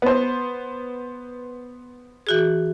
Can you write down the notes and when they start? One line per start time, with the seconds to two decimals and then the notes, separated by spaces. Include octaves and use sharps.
0.02 B3 C5
2.27 E3 F#4 G#4